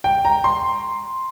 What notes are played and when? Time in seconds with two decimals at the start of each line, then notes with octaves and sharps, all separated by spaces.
0.04 G5
0.25 A#5
0.44 C6